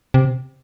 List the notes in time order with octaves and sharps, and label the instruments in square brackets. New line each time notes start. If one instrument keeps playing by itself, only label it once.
[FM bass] C3